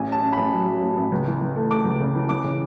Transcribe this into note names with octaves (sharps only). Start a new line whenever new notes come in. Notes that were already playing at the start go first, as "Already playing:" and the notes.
Already playing: A1 G#5
C#4 A5
C#4
A1 B5
F#3
F#3
A1
A1
C#2
E3
E3
A3
A3 D6
C#2
C#3
E3
E3 D6
C#3